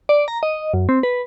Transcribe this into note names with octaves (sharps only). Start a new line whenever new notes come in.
D5
A#5
D#5
F#2
C4
B4